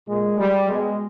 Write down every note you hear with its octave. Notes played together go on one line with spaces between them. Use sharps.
A#2 G#3
G3
B2 G#3